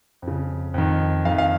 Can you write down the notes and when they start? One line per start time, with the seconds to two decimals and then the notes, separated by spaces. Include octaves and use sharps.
0.22 F2
0.28 C#3
0.74 F2 D#3
1.25 F2 D#3 F5
1.38 F5